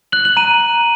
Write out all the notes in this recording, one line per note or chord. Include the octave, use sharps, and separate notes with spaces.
F#6 F#7
F#7
A#5 D#7